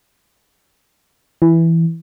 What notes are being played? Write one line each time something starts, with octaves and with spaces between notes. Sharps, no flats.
E3